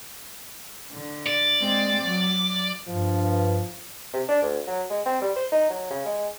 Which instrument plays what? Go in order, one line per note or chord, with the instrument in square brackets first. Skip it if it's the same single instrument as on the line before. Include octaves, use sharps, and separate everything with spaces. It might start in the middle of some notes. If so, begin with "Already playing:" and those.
[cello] D3
[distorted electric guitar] D5
[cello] G#3 C4
F#3
[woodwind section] G2 [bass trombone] F3
[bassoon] C3
D4
D2
F#3
G#3
C4
G3
C5
D#4
F#3
C#3
G#3